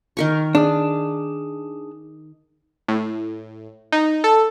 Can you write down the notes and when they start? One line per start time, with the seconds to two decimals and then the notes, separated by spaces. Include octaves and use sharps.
0.17 D#3 A#4 C#6
0.55 D4 G#4 D#6
2.88 A2
3.92 D#4
4.24 A4